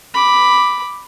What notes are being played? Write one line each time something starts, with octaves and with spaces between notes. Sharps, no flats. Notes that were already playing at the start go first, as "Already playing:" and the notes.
B5 D6